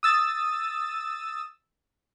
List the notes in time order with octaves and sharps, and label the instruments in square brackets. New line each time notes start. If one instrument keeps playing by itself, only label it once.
[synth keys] D#6 E6 A6